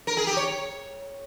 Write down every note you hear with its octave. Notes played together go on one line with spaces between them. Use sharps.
A#4
G#4
G4
C#5